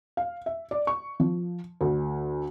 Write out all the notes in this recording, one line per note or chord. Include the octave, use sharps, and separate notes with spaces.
F5
E5
D5
C#6
F3
D2